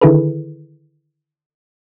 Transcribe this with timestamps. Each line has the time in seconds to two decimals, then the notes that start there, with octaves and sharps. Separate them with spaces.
0.01 D3 D#3 E4 G#4 A4 B4